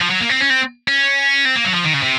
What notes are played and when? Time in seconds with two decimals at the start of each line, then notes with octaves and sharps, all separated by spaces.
0.02 F3
0.11 F#3
0.21 A#3
0.30 C4
0.41 C#4
0.50 C4
0.88 C#4
1.45 C4
1.56 A#3
1.65 F#3
1.74 F3
1.85 D#3
1.94 C#3
2.03 C3